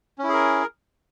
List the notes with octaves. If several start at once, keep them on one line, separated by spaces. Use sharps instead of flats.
C#4 E4 G#4 A#4